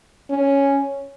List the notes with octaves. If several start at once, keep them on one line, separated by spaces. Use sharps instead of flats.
C#4